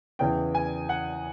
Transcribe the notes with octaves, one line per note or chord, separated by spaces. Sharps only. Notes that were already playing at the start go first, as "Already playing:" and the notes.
E2 C#3 E3 G5
G#5
F#5